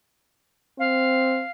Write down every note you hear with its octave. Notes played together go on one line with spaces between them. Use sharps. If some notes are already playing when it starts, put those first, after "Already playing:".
C4 F5